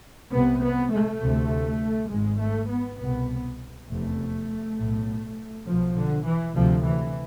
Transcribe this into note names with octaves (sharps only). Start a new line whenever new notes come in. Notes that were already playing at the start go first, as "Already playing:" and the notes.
C2 C3 B3
B3
A3
D2 C3
G#1 G#2 G#3
A3
B3
C2 B2 B3
F1 E2 C3 A3
B1 A2
B1 B2 F3
D3
E3
D2 C3 F3
E3